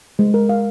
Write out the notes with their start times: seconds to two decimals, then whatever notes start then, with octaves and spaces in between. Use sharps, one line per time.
0.19 G#3
0.34 A#4
0.49 F5